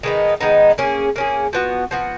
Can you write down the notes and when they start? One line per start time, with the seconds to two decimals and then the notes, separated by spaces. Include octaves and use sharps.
0.03 D#3 G#3 B3 D#4
0.41 D#3 G#3 B3 D#4
0.78 A#3 C#4 G#4
1.16 A#3 C#4 G#4
1.53 F3 B3 F#4
1.91 F3 B3 F#4